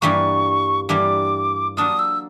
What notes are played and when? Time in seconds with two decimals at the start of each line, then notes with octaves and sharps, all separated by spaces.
0.02 G2 E3 G3 A#3 C#6
0.89 G2 E3 G3 A#3 D6
1.77 F#3 A#3 D4 F4 D#6
1.99 E6